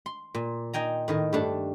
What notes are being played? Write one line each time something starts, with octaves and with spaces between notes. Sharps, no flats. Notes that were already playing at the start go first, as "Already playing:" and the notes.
C6
A#2
D#4 D#5 G5 G#5 A#5
A2 D#3 D#5
G2 A3 D4 A5